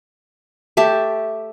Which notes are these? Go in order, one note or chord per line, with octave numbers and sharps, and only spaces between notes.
A3 G4 E5 A5